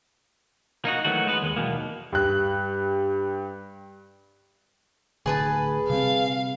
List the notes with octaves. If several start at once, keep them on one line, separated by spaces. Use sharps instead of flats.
A#3 D#4 F#4
D#3 E3 F#3 A3 F#4
G#3 B3 B4
D#2 G#3
B1 E2 B2 D#3 A#3
G2 F#6
D1 D2 D3 G#4 B4 A5
C3 G3 C4 F5